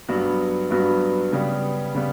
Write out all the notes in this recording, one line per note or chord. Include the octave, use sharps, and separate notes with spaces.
G2 F#3 B3 F#4
G2 F#3 B3 F#4
C#3 G3 B3
C#3 G3 B3